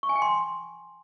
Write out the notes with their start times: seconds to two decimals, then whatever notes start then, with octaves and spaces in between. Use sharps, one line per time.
0.03 C#6
0.09 G#5
0.16 G5
0.22 C6